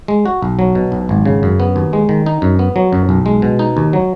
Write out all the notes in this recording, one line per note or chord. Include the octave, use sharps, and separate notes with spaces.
G#3
F#4
B1
F#3
B2
B1
G#1
C#3
F#2
B3
D#2
G#3
D#3
D#4
F#2
B3
F#3
F#2
B1
G#3
B2
D#4
D#2
F#3